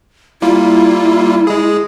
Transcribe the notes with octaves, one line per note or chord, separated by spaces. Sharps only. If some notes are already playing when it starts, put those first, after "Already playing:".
G3 A#3 E4 F4
G#3 G#4